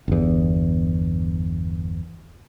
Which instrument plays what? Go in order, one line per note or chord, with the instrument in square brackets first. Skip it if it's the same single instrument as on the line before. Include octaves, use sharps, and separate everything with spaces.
[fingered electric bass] G1 E2